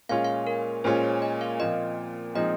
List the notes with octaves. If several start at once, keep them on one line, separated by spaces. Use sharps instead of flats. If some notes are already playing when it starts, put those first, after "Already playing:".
A#2 G#3 C#4 F4 F5
F5
A#4
A#2 G#3 C#4 F4 C5
C#5
D#5
F5
A#2 F3 C4 F4 D#5
A#2 F3 G#3 C4 D#4 D#5